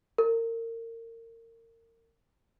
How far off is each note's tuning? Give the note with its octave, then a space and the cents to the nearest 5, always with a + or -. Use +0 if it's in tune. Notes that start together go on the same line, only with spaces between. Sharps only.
A#4 -30